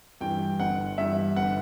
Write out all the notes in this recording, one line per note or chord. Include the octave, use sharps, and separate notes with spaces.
G2 E3 G5
G1 F#5
G2 E3 E5
G1 F#5